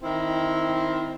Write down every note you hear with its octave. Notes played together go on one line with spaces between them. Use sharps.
D#3 C4 E4